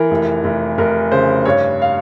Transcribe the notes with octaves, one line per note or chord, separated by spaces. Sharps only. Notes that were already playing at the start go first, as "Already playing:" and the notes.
Already playing: E3 A#4
F1
F1
F1 A#4
C#3 C5
G2 C#5
F5